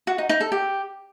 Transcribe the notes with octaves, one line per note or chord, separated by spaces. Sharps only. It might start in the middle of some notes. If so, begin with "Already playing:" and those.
F#4
D#4
D#4
A4
G4